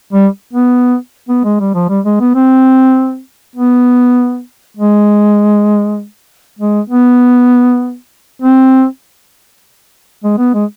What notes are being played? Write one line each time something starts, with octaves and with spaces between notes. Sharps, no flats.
G3
B3
B3
G#3
G3
F3
G3
G#3
B3
C4
B3
G#3
G#3
B3
C4
G#3
B3
G#3